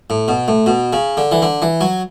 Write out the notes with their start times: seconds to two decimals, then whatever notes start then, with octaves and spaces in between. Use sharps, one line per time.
0.10 A2
0.28 B2
0.48 A2
0.66 B2
0.93 C#3
1.17 D3
1.32 E3
1.42 D3
1.62 E3
1.81 F#3